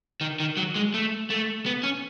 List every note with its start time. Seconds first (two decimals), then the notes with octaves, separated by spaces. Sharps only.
0.21 D#3
0.40 D#3
0.57 F#3
0.75 G#3
0.94 A3
1.30 A3
1.66 B3
1.83 C#4